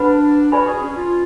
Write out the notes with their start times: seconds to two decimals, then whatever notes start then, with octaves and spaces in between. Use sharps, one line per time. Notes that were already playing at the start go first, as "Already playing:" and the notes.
Already playing: D4 B4 F#5 B5
0.52 F#4 B4 D5 G#5 B5
0.62 F#4
0.67 G#4
0.81 C#4
0.96 F4